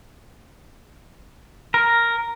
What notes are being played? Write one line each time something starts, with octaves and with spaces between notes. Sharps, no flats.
A#4